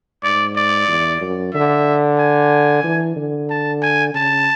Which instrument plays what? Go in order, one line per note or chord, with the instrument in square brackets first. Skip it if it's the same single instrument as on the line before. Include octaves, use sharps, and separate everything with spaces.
[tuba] G#2 [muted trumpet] D5
[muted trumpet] D5
[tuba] E2
F#2
[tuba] D3 [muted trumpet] E5
[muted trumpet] G#5
[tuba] E3
D3
[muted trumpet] A5
G#5
[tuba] C#3 [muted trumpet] A5